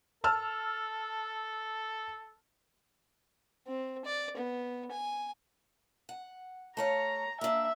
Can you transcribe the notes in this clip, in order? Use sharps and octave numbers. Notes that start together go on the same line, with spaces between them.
A4 A5 E6 F6
C4
D5
B3
G#5
F#5
A3 C#5 F5 A#5
A#3 D4 E5